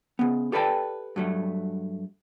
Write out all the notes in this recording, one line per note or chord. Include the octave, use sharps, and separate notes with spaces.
C#3 B3
G4 A4 B4 D5 G5 A5
G2 F#3 A3